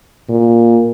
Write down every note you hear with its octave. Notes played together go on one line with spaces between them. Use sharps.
A#2